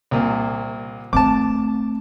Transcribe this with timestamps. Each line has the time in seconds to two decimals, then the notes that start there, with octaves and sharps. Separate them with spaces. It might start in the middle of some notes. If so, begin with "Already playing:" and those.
0.11 C2 A#2
1.13 A3 C4 A5 D6